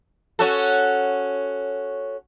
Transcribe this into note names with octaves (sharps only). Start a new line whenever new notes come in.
C#4 F#4 A4